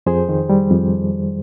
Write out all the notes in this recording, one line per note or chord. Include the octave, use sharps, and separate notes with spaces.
F2 G#4 C5
D#3
G3
F2